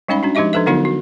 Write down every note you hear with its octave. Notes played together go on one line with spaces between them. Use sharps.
G3 G#3 C#4 D#4 F5 B5
C#4 D4 F#4
F3 G#3 D#4 G4 D#5 E5
F3 D4 A4 B4 E5
D3 F#3 B3 D#4 E4 F#4
F#4